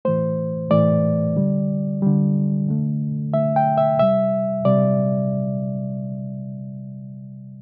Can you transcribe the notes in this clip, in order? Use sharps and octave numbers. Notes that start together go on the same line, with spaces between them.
A2 E3 A3 C5
A2 E3 A3 D5
D3 G3
D3 G3
D3 A3
D3 A3 E5
G5
E5
C3 G3 E5
C3 G3 D5